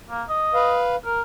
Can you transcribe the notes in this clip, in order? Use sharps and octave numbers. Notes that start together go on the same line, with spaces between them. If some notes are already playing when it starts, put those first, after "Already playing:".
A#3
D#5
B4 F5
A#4